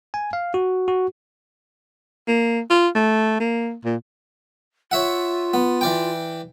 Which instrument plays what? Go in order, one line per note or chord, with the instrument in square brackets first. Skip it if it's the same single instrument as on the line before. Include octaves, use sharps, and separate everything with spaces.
[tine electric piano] G#5
F5
F#4
F#4
[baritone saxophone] A#3
F4
A3
A#3
A#2
[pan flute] F4 [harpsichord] C#5 E5 F#5
[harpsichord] B3
E3 D5 G5